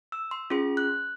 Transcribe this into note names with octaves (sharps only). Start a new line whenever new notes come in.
E6
C6
C#4 F4 G#4 C6
F#6